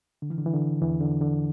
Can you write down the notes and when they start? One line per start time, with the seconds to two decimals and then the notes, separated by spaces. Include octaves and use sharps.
0.22 D3
0.30 E3
0.38 D3
0.46 E3
0.54 D3
0.81 E2 E3
1.00 D3
1.21 D3